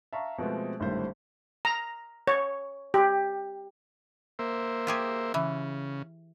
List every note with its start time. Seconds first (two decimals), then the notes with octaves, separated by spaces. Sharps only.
0.13 E5 F5 A5 A#5 C#6
0.38 B2 F3 G#3 A3 B3 C4
0.80 G#1 A2 D3 G3 C5
1.65 A#5
2.27 C#5
2.94 G4
4.39 A#3 C5 E5
4.87 F4 G4 G#4
5.34 C#3 E3